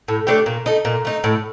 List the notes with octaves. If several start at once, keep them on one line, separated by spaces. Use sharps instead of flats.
A2
A3 D4 G4
A#2
A3 D#4
A#2
A3 D#4
A2